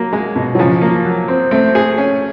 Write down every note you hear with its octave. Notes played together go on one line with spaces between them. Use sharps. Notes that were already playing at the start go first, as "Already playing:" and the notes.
Already playing: F#3 A#3
G#3
B2
F#3
C#3 F3
A#3
F#3
C4
A3 C4
G#4
C#4